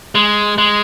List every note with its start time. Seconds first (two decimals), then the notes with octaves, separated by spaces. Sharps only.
0.15 G#3
0.58 G#3